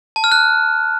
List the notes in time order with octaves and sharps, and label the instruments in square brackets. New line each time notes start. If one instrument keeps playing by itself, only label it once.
[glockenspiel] A5
F6
F#6